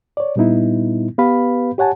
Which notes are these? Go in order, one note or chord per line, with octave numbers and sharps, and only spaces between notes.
C#5 D5
A#2 G3 B3 D#4 E4
B3 G4 B4 F5 B5
G4 C#5 F#5 G#5 A5